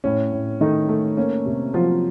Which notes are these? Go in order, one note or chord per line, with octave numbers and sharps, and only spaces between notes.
A2 C#4
A2
D#3 A3 D#4
A3
A#3 C#4
C3
F3 F#3 F4